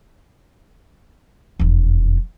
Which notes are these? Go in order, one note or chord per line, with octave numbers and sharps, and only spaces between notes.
E1 F2